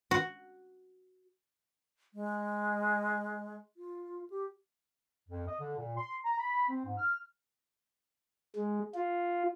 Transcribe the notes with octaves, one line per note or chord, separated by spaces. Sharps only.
F#4
G#3
F4
G4
F2
D#5
D3
A#2
C6
A#5
B5
C4
G#2
F6
G#3
F4